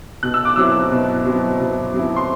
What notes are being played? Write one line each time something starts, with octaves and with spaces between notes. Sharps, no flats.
B2 F#6
E6
D6
F#3 C4 E4 E6
B2
F#3 C4 E4
B2
F#3 C4 E4
C6